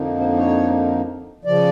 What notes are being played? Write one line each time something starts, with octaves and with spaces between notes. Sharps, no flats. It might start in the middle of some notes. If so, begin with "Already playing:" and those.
Already playing: F2 D3 F3 A#3 D#4
C5
C#5
C#3 F3 D5